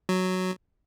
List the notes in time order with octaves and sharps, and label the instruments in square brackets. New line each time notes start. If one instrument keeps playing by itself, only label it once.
[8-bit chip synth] F#3